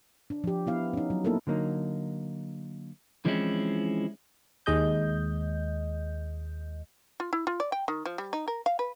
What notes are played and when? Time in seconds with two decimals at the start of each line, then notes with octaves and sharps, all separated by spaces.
0.30 D4
0.44 F3 G4
0.67 B3 E4 F5
0.93 C#4 D#4
1.10 F#3
1.24 A#3 B3 D#4 E4 A4 A#4
1.47 D3 F#3 A#3 D#4
3.25 E3 F3 G#3 C4 C#4 E4
4.66 D#2 G#3 D#5 G6
7.20 F4
7.33 E4
7.47 F4
7.60 D5
7.72 G5
7.88 D#3
8.06 F3
8.18 G3
8.33 D#4
8.48 A#4
8.66 F5
8.79 B4